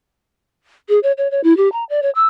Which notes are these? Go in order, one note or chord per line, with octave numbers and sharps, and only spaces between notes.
G#4
C#5
C#5
C#5
E4
G4
A#5
D5
C#5
E6